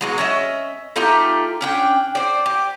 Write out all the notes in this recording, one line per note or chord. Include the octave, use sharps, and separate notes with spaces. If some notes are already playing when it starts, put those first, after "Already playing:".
B2 F#3 G#3
C#4 D#5 E5
A3 D#4 F4 G4
C#4 D4 G5
C5 D5
G4